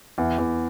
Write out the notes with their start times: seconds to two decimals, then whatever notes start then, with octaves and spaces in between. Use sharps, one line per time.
0.18 E2
0.38 E2